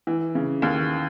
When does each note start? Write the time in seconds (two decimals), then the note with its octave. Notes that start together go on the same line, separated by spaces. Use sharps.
0.07 E3
0.35 C#3
0.62 D#2